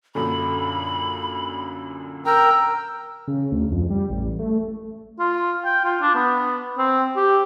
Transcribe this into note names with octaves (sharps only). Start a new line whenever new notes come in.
F#2 A#2 D3 B5
A#4 G5 A#5 E6
C#3
D2
F2
G3
A1
A3
F4
G5
F4
D4
B3
C4
G4